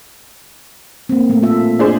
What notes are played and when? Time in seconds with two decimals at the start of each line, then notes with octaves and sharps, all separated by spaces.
1.09 A#3 C4
1.29 A#2 A3
1.43 F4 A4 E5
1.79 D4 G#4 C5